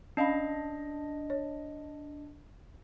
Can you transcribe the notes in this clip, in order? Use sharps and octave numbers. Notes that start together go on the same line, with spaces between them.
C#4 D4 D#5 F5 B5
C#5